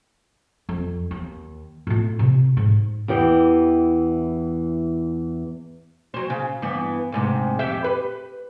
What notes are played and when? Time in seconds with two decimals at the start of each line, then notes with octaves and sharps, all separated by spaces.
0.69 F2
1.11 D#2
1.87 A2 F4
2.19 C3
2.57 G#2
3.08 E2 E3 G4
6.14 F#3 C5
6.30 C#3
6.62 G2 E3 B3
7.12 D2 G#2 C3
7.59 F2 G4 E5
7.84 B4